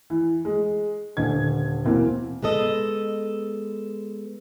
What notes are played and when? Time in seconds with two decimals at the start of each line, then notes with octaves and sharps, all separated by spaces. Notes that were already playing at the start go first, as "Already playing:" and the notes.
0.10 E3
0.45 G#3
1.17 D#1 D3 G#6
1.85 B2 E3 A#3 C4
2.43 G#3 B3 A4 D#5